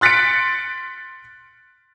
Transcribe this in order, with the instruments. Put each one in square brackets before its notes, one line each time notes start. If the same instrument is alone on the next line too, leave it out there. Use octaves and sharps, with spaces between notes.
[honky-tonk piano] C6 F#6 A6 B6 C#7 D7